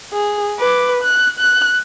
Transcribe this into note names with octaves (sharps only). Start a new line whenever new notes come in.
G#4
B4 D6
F#6
F#6